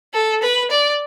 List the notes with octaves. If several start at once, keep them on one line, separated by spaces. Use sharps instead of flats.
A4
B4
D5